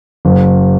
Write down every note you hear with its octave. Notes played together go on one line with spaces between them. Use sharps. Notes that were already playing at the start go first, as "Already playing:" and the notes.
F#1